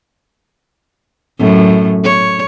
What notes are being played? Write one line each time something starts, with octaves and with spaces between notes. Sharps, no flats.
F#2 A2
C#5